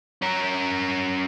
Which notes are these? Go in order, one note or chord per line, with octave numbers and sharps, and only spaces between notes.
C#4 A#4